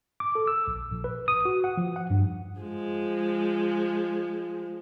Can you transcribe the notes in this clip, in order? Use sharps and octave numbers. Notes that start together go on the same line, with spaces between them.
D6
A4
E6
A#1
A#1
B4
D#6
F#4
F#5
F3
F#5
G2
F3 G#3